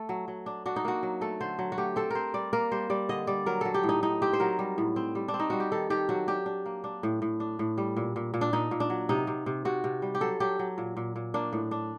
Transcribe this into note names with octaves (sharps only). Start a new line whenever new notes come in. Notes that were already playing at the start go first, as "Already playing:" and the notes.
Already playing: A3 A4
F#3
F#3
D4
D4 F#4
D#4
A#3 F#4
F#3
A3 A4
D3 C5
F#3
F#4
A3 G4
C4 A4
C4 A#4 C5
G3 D5
A#3 A#4
G3 C5
G3 D5
D3 D#5
G3 D5
F#3 A#4
F#3 A4
G4
A2
D#4
A2 D#4
C4 G4
C5
F#3 A#4
G3
A2
C4
G3
D4
C4
D#4
G3 F#4
G4
D#3 A4
D#3 G4
F#3 F#4
D4 G4
D4
A#3
D4
A2
A2
D4
A2
G3
A#2
A#2
A#2
D4
A#2 D#4
A#2
D4
F#3
C3 D#4
C3
C3
C3 F#4
C3
G3
G4
F#3 A4
F#3 G4
F#3
A#2
A#2
A#2
A#3 D4
A2
D4